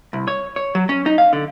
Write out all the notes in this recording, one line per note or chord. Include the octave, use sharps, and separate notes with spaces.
C2
C#5
C#5
F#3
C#4
D#4
F5
D3